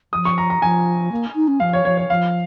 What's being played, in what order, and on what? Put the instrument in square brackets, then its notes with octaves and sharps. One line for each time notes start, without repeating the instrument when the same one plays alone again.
[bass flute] F3 [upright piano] D#6
[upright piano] C#6
A#5
A#5
[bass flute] F3 [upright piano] G#5
[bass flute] A#3
D#4
C#4
[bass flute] F3 [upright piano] F5
[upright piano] C#5
[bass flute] F3 [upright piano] C#5
[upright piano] C#5
[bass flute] F3 [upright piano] F5